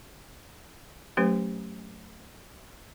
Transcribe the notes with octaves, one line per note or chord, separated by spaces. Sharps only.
F#3 A3 C#4 G4 B4